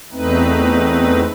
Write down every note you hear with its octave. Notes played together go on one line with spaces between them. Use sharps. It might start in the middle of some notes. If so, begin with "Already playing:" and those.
E2 A3 C4 D#4 B4